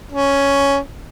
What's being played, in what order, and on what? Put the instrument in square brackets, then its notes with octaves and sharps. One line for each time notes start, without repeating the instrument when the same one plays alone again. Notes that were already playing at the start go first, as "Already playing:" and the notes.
[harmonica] C#4